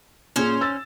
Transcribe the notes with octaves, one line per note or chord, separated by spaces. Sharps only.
A#2 C#4 G#4 C5
E6 A6